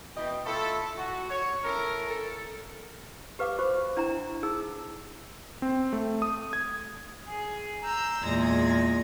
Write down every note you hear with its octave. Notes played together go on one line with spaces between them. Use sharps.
B2 E3 D#5 G5
A3 E4 F4 A4
F#4
C#5
C#4 E4 A4 A#4
A4
G4 B4 F5 D6
F#4 C5 C#6
D4 E4 G5 A#5
D#4 G#4 E6
C4
A3
D#6
G#6
G#4
A#5 E6 G6
E2 A#2 G#3 G#6 A#6